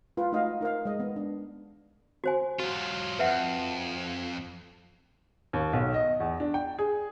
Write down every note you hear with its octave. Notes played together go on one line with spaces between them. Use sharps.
G#3 F4 B4
A3 D#4 F#4 D#5 F5 F#5
D#4 A#4 C5 F5
G#3 D#5
B3
D4
F#4 C5 G#5
F#3 F4 F#4
F2 B4 E5 F#5
D#2
B1
D#5
E2
D4
G5
G#4